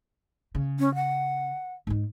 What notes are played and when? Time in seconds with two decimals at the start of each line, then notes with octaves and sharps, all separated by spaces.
0.55 C#3
0.79 C#4
0.95 F#5
1.87 G#2 D#4